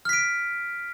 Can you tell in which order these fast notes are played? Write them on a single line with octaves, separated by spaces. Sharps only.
F6 B6 D7